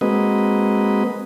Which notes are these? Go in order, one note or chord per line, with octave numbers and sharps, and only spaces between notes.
G#3 A#3 C4 F#4 B4 D#5